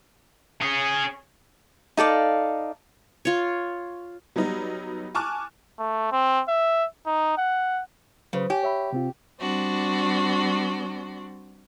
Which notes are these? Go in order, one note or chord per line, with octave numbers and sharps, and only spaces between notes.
C#4 G#4
D#4 A4 D5 F5
F4 C#5
F#3 G3 B3 D#4
G#5 A5 C#6 D6 F6 F#6
A3
C4
E5
D#4
F#5
C#3 F#3 B4 C5
G4 C#5 G#5
C#5 E5 B5
C3 C4 F4
G3 C4 D4 F#4